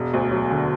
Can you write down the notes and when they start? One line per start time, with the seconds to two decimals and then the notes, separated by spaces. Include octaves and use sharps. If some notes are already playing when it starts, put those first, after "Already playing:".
Already playing: E1
0.14 D2
0.31 F#3
0.51 D3